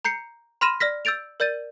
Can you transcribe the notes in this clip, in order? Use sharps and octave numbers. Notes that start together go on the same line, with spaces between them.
A#5 G6 C7 C#7
B5 C6 F6 A#6 D#7 E7
D5 F6 A#6 B6
E6 G6 A6 D7 F7
A#4 D5 G6 A6 D#7